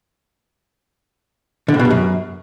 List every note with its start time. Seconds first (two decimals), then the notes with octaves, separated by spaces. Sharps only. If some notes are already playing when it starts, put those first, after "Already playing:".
1.68 D3
1.74 A2
1.79 B2
1.85 G2
1.90 F#2